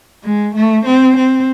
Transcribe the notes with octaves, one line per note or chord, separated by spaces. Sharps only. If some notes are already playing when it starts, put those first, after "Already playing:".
G#3
A3
C4
C4